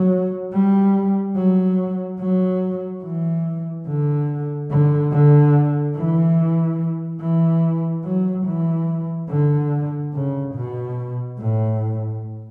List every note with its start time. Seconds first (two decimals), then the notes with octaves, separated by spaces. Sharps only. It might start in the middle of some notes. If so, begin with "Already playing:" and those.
Already playing: F#3
0.52 G3
1.36 F#3
2.20 F#3
3.04 E3
3.87 D3
4.70 D3
5.12 D3
5.96 E3
7.21 E3
8.05 F#3
8.46 E3
9.29 D3
10.14 C#3
10.55 B2
11.39 A2